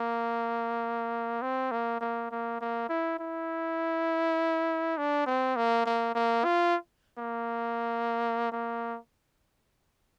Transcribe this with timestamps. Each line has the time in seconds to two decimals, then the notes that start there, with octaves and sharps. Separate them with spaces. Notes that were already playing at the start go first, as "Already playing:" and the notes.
Already playing: A#3
1.42 C4
1.71 A#3
2.01 A#3
2.31 A#3
2.61 A#3
2.89 E4
3.19 E4
4.98 D4
5.26 C4
5.56 A#3
5.86 A#3
6.15 A#3
6.45 F4
7.19 A#3
8.52 A#3